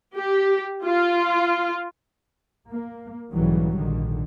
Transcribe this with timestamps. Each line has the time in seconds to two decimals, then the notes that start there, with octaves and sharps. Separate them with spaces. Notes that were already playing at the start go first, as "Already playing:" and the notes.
0.16 G4
0.84 F4
2.71 A#3
3.32 B1 G#2 C#3 E3 F#3 G3
3.76 A#1 G#2 D3 D#3